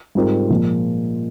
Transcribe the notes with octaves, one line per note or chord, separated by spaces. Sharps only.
G#2 G3 C4 F4 A#4
A#2 F3 G#3